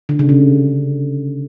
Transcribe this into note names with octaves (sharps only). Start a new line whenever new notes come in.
D3
C#3
C3